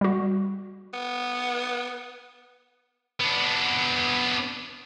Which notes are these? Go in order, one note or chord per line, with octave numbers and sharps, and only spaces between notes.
G3 F#4
B3
B3 D4